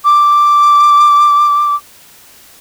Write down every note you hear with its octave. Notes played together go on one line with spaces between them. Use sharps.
D6